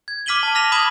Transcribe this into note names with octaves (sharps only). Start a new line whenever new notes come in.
G#6
D6 F6 B6 D#7 F#7 G7
A5
F6 A#6 B6 F7
B5 D6 D#6 G#6 E7 F#7